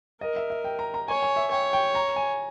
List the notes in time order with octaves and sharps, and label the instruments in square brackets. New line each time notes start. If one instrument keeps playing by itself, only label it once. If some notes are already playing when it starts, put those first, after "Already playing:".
[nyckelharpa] A#4 [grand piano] D#5
[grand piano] E5
E5
G5
A#5
A#5
[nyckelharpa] C#5 [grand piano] G#5
[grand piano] G#5
E5
[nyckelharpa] C#5 [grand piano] G5
[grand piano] G5
A#5
G#5